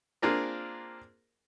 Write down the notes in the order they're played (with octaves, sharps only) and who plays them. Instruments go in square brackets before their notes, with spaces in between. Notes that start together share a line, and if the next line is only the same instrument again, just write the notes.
[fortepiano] A#3 C4 D4 F4 G#4 A#4